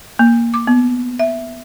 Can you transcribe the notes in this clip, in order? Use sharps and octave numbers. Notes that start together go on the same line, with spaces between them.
A#3
D6
B3
E5